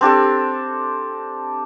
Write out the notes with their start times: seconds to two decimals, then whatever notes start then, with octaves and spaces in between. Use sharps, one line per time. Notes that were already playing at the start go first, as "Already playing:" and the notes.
0.01 C4 D4 G4 A4